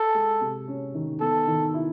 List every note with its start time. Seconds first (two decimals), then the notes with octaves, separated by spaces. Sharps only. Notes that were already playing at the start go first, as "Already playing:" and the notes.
Already playing: A4
0.15 G#3
0.41 C3
0.68 C#4
0.94 D#3
1.21 B3 A4
1.47 D#3
1.74 E4